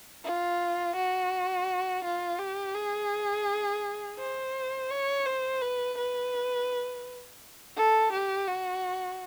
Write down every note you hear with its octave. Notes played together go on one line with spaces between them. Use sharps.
F4
F#4
F4
G4
G#4
C5
C#5
C5
B4
B4
A4
G4
F#4